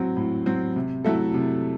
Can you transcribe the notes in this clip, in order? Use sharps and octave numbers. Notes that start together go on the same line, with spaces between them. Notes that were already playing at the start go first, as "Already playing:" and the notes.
Already playing: A2 F#3 C4
A2
F#3 C4
C3
F#3 A3 E4 A4
C3